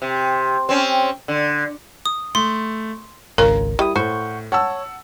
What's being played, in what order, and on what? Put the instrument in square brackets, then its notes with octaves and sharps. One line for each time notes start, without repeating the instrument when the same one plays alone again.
[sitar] C3
C4 C#4
D3
[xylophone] D#6
[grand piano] A3 [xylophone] C6
[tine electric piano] G#1 C#2 [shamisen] C#4 F4 [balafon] A#4 [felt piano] A#5
[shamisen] G3 [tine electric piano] E4 D#6
[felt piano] A2 [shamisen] C5 [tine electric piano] F#5 C#6 G6
[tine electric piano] C#5 [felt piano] F#5 A5 E6